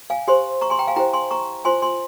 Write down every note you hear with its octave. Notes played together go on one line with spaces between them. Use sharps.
F5 G#5
G4 C5 G#5 C6
A#5 C#6
G#5 C6
G5 A#5
F5 G#5
E4 G4 C5 G5 A#5
G#5 C6
A#5 C#6
F4 C5 G#5 C6
G#5 C6